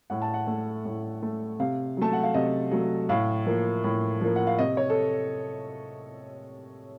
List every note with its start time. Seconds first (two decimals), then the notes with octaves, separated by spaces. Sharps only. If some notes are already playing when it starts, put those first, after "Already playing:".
0.10 A2 F#5
0.22 A5
0.34 F#5
0.47 A3
0.85 A2
1.22 A3
1.60 C3 F5
1.97 F#3 A3 A5
2.13 F#5
2.23 F5
2.34 C3 D#5
2.72 F#3 A3
3.09 A2 F5
3.46 F3 A#3
3.84 A2
4.21 F3 A#3
4.36 F#5
4.47 F5
4.59 C3 D#5
4.77 C#5
4.90 A4